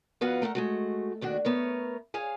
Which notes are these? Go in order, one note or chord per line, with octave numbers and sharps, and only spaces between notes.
F2 B3 F#4 B4 F5 F#5
A3 A#4 D5 F#5
G#3 A3 F#4
D#2 D#3 D4 F#4
A3 B3 A#4 C#5
G#4 C#5 F5 G#5